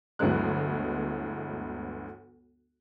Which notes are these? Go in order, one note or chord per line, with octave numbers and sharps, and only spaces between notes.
G1 D2 E3 F#3 G#3 F#6